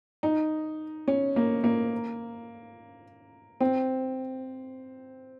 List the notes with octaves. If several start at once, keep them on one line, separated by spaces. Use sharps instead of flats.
D#4
C#4
A#3
A#3
C4